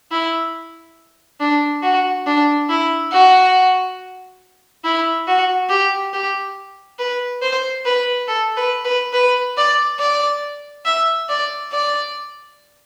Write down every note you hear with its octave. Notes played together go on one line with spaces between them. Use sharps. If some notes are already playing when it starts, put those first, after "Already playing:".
E4
D4
F#4
D4
E4
F#4
E4
F#4
G4
G4
B4
C5
B4
A4
B4
B4
B4
D5
D5
E5
D5
D5